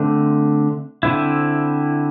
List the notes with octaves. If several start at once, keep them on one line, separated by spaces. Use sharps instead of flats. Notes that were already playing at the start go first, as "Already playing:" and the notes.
Already playing: D3 A3 C4
D3 C4 E4